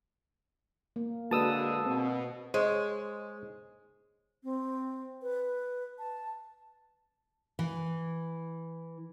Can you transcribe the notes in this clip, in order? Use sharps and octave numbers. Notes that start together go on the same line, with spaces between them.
A#3
D3 G#3 A#3 F#4 B4 A5 D#6 E6
B2 C4
G#3 C5 C#5
C4
B4
A5
E3